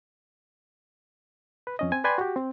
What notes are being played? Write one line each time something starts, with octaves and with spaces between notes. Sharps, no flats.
B4
F2 C#4 D#5
C4 G#5
B4 D5 G5 G#5 B5 C6
F#4 G4
C4